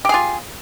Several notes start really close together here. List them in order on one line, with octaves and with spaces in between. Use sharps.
G4 G#4 F4